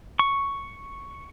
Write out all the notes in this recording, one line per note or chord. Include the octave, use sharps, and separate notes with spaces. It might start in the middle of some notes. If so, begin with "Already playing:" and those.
C#6